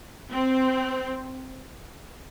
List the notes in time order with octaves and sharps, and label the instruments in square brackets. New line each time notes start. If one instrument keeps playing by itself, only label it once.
[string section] C4